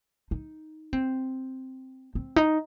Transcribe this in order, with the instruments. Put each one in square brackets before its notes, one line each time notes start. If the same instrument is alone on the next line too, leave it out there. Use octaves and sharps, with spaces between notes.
[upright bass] D#4
C4
C4
D#4